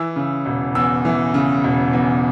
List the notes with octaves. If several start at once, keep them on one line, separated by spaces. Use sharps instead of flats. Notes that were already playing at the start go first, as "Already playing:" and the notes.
Already playing: E3 E6
C#3
E1
E2 E6
E3
C#3
E1
E2